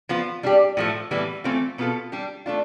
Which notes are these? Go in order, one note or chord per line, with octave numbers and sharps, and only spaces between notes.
F3 B3 F4
G3 D4 G4
A2 F3 A3
A2 E3 G3 B3
E3 A3 C4 F4
B2 B3 F4 A4
G3 D4 G4
A3 D4 F4